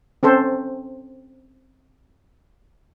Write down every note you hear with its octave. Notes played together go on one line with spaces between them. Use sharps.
C4 C#4 A4 C5